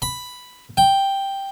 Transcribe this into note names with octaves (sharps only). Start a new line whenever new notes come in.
B5
G5